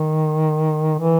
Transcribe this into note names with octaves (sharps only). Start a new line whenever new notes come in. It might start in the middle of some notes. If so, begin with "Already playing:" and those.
Already playing: D#3
E3